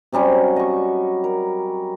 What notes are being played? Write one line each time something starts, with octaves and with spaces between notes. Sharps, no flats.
C3 F#3 G3 C#4
D#5 C#6
A#4